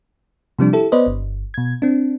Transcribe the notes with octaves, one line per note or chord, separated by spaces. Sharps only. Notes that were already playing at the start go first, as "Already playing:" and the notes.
C3 F3 G3 D4
E4 G4 A4
B3 B4 C5 D5 D#5
G1
B2 G#6
C4 D4